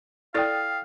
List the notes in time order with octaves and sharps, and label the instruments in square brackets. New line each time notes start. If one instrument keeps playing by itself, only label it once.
[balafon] E4 A4 D5 [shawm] F5 [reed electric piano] G5 D#6 A6